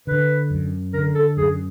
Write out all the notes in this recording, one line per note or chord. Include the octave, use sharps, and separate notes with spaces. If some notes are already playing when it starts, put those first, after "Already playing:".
D3 B4
F#2
D3 A#4
A4
F#2 G#4